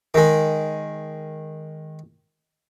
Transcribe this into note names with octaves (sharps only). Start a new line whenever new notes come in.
D#3 G#3